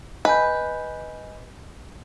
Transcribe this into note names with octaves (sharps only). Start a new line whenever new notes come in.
B4 D#5 G#5 G6